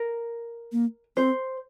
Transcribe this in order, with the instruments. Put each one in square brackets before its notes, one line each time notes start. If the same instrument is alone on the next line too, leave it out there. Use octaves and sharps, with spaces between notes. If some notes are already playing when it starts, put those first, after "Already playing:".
Already playing: [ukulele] A#4
[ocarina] A#3
[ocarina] C4 [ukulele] C5